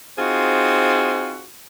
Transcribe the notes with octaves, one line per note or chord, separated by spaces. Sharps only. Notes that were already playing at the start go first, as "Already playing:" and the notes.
C4 D#4 F4 F#4 G#4 C5